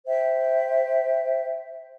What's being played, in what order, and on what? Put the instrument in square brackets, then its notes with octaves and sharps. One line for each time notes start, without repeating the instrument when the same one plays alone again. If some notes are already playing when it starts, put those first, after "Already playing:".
[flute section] C5 E5 G5